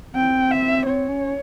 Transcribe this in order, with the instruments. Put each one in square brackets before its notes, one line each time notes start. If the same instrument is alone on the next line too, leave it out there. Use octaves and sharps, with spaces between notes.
[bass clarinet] C4 [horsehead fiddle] G5
[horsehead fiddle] E5
[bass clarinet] C4 [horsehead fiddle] C#5
[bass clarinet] C#4